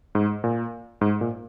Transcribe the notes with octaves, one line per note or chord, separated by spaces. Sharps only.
G#2
A#2
G#2
A#2